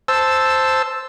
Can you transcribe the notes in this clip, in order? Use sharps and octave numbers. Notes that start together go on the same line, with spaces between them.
C5 A5 E6